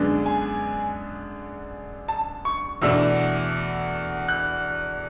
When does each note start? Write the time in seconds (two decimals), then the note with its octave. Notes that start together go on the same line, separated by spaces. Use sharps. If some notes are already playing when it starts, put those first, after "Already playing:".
Already playing: F#2 D3 G#3 B3 D4
0.26 G#5
2.08 A5
2.45 C#6
2.82 E2 B2 A3 D4 E6
4.28 F#6